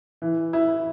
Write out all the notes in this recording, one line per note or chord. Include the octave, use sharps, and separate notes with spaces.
E3
E4